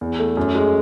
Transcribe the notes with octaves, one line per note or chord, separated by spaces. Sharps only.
E2
A3
F#2
G#3